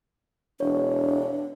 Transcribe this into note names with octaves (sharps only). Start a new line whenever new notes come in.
E1 D4 C#5